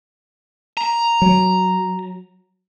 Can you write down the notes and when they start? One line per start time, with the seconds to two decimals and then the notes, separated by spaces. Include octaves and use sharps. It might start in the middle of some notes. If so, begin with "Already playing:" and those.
0.77 A#5
1.22 F#3